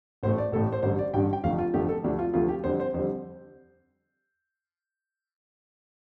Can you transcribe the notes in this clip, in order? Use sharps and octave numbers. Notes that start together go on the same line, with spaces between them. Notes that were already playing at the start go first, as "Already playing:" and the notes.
A1 A2 A3 C5
D5
A1 A2 A3 A4
C5
A1 G2 D3 G3 C5
D5
A1 G2 D3 G3 G5
G5
F1 F2 D3 F3 A3 F5
F4
F1 F2 D3 F3 A3 G4
A4
D2 C3 F3 A3 D4
F4
D2 C3 F3 A3 F4
G4
F2 D3 G3 C5
C5
F2 D3 G3 C5